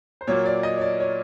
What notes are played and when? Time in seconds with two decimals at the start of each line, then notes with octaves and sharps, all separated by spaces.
0.21 C5
0.27 A#2 F#3 A#3 C#5
0.46 D5
0.63 D#5
0.78 C#5
0.81 D5
1.00 C#5